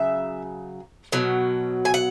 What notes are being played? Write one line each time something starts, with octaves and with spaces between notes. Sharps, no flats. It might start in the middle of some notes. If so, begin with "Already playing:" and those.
Already playing: C#3 F#3 E5
B2 F#3
G#5
F#5